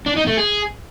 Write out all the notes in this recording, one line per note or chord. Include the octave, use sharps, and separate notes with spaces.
D4
D#4
A3
G#4